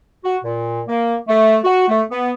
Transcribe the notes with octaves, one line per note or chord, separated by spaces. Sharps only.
F#4
A#2
A#3
A3
F#4
A3
B3